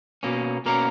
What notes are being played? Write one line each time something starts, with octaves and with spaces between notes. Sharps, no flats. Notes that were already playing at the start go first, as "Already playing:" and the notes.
B2 A#3 C#4
B2 A#3 C#4 A#4